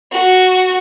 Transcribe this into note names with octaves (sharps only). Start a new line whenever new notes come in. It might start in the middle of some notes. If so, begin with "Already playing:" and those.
F#4